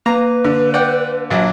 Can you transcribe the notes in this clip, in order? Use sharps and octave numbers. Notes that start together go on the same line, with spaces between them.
A#3 B4 A#5
D3
D5 F#5 G5
A#1 F#3